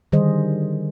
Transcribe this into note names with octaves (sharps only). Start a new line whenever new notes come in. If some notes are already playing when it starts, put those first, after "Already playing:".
D3 D#3 G3 G#4 C5 D#5